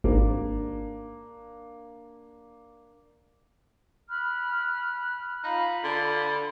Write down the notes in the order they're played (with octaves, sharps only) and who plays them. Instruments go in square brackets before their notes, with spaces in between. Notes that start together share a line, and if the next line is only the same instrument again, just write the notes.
[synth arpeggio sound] G#1 [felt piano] A#3 D4
[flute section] B5 F6 F#6
[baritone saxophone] D#4 [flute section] F4 F5 B5
[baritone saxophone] D3